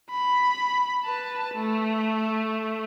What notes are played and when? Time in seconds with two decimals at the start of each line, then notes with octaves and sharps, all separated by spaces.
0.10 B5
1.04 B4 A5
1.55 A3